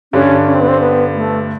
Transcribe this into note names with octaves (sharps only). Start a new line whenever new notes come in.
G2 D3 G3 C#4
C#4
C4
B3
C4
B3
A3